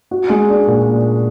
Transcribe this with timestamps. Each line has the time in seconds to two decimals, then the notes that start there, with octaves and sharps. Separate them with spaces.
0.11 F#4
0.30 G#3
0.49 D4
0.67 A#2